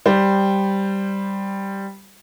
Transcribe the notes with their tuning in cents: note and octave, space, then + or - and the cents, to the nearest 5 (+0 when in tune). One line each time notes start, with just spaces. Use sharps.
G3 +0 C5 +0